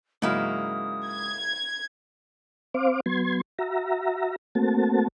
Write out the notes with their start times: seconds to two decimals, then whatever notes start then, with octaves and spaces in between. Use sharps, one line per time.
0.22 G#2 C#3 F#3 A#3 E4 D#6
1.08 G#6
2.74 C4 C5 F5 D6
3.06 F#3 B3 C6 G#6
3.59 F#4 E5 A#5
4.55 A3 A#3 C4 F#4 A5